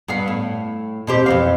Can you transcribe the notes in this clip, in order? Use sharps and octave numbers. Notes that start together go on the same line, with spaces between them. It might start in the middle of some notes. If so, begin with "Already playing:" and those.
G2 B3 F5
A2
B2 C4 G4
F2 E3 F5